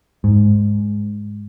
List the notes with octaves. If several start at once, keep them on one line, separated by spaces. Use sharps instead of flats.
G#2